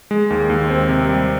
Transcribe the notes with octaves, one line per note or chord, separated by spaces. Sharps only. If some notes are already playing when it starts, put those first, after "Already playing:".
G#3
D#2
D#2
C4
C3
G3